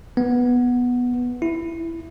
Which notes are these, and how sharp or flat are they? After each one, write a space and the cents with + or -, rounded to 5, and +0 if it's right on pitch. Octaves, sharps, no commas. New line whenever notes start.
B3 -5
E4 +10